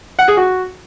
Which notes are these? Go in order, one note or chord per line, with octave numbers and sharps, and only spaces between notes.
F#5
G#4
F#4